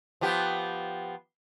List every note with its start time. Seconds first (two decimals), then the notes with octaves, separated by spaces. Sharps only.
0.21 F3 B3 G4